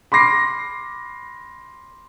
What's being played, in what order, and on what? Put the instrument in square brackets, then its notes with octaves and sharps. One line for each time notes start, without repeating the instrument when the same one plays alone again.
[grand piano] B5 C6 D6 A#6 C7